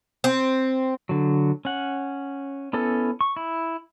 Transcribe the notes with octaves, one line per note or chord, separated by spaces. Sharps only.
C4
D3 F#3
C#4 F#5
B3 C#4 E4 A4
C#6
E4